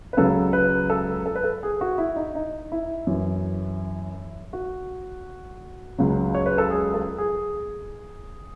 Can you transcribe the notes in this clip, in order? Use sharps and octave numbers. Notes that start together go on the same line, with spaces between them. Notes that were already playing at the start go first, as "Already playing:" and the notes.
B4
C#2 C#3 F#3 A4
B4
A4
A4
B4
A4
G#4
F#4
E4
D#4
D#4
E4
F#2 E3
F#4
C#2 C#3 F#3
C#5
B4
A4
G#4
A4
G#4